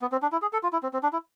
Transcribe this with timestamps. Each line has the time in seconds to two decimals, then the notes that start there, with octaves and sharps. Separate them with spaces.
0.01 B3
0.12 C4
0.22 D4
0.32 E4
0.42 G#4
0.53 A4
0.63 F4
0.73 E4
0.83 C4
0.93 C4
1.03 D4
1.13 E4